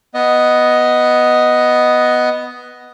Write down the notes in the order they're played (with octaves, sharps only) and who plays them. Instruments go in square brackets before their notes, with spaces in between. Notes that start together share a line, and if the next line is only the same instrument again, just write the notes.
[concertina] B3 D#5